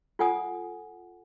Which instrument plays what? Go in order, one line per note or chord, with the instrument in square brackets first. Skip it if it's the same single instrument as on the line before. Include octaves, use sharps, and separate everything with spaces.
[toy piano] F4 A4 F#5 G#5 D#6